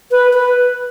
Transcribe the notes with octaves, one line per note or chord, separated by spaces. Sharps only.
B4
B4